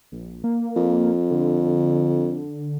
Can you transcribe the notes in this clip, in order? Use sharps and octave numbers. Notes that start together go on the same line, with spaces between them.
A#1
A#3
F2
D3